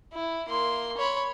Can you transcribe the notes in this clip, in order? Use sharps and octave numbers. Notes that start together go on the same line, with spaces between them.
E4
A#3 C6
C#5 B5